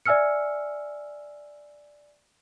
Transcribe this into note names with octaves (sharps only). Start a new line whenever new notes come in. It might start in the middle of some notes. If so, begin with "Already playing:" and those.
D5 E5 G#5 E6 F6 C#7